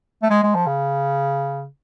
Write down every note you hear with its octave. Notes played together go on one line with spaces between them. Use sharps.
A3
G#3
G#3
F3
C#3